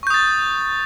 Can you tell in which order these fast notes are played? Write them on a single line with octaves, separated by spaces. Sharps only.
C#6 G6 D#6 A6